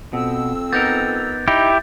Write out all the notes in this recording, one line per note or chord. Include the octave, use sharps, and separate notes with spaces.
F2 B2 C4 E6
B3 D#4 A#4 D6 G6 A6
D#4 E4 G4